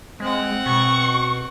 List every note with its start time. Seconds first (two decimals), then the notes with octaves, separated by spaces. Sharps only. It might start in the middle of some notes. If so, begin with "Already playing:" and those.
0.20 G#3 C4 F#5
0.66 B2 C#6